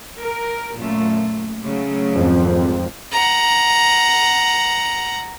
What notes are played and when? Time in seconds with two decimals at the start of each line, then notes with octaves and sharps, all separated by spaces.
0.18 A#4
0.76 F#2 A#2 A3
1.62 C#3 F#3 A3
2.14 G#1 F2 F3
3.12 F#5 A#5